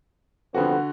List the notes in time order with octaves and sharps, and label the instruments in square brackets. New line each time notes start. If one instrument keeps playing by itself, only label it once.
[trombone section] C2 F2 B3 [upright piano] D3 F#4